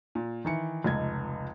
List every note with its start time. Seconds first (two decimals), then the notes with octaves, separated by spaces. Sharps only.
0.15 A#2
0.45 D#3 E3 C#7
0.84 F1 C#2 D#5 G#6